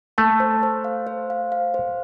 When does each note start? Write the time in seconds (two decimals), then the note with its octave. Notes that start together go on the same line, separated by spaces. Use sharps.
0.18 A3 A5
0.40 C5
0.63 C5
0.84 F5
1.07 C5
1.30 F5
1.52 F5
1.74 C5